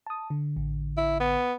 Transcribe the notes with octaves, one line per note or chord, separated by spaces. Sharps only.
A5 D#6
D3
A1 D3
E4
B3